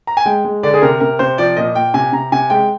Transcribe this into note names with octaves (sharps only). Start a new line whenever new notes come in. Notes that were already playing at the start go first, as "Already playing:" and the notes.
A#5
G#5
G#3 G5
G#3
D3 D5
G#4
C3 A#4
C3 A#4
C3 C5
F3 D5
A#2 D#5
A#2 G5
C3 G#5
C3 A#5
C3 G#5
G#3 G5